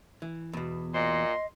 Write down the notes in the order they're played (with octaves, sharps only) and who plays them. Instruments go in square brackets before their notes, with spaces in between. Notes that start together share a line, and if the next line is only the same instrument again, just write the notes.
[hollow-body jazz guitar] E3
E2 B2
[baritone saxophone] A#2 [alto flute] D#5 [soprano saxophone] C6